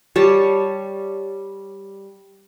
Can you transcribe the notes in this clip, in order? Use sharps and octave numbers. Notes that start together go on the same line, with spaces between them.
G3 C#5 A5